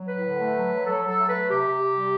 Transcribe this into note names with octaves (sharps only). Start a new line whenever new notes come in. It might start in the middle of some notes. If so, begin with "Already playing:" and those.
Already playing: F#3
A2 B4
D3
A3
F#3
F#3
F#3 A4
F#3 A4
A3
A3 B4
C3 G4
C3
C3
G3